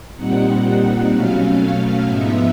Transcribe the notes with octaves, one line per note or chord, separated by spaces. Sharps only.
A#2 G3 C4 D#4 F#5
B2 F#3 A3 C#4 F5
F5
G#2 F3 G#3 B3 D#4 E5